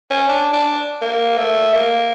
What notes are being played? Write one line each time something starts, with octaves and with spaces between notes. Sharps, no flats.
C#4
D4
D4
A#3
A3
A#3